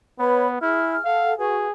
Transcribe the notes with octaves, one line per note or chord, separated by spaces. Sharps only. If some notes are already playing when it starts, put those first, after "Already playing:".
B3 B4 C#5 B5
E4 G#4 F6
A4 F5 F#5
F#4 G#4 B4